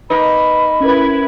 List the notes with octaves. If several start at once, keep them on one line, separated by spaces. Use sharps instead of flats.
A#3 D#4 B4 B5
C#4 E4 A#4 B4 G#6